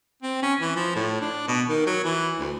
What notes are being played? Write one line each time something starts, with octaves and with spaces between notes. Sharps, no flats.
C4
C#4
E3
F3
A2
D4
B2
D#3
F#3
E3
D2